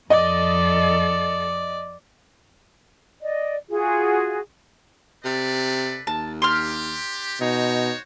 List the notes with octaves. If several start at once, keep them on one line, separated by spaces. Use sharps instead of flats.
F2 A4 D5 D#5
D5 D#5
F4 F#4 G#4
C3 A4 B4 D5
D#2 A5
D4 G4 C6 F6
B2 D#4 F#4 C5 C#5